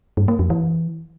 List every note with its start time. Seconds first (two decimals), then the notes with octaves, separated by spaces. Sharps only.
0.17 G2
0.28 A#3
0.39 F2
0.50 E3